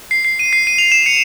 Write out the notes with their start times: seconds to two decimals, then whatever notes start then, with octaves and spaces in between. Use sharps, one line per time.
0.11 C7
0.25 C7
0.39 D#7
0.53 C7
0.67 D#7
0.78 F7
0.92 E7
1.06 C#7